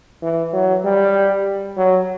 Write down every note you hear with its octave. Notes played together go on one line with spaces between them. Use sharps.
E3
F#3
G3
F#3